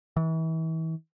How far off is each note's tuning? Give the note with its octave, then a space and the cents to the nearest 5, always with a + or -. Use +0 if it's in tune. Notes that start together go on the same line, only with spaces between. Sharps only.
E3 -35